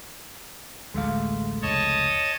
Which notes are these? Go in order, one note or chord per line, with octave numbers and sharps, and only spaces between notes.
A1 D2 G#3 A3 F5
F1 C#2 C#5 D#5 A5